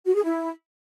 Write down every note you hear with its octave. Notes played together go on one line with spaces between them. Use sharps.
F#4
G#4
E4